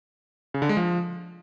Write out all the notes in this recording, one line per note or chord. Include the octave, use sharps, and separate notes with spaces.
C#3
D3
G#3
F3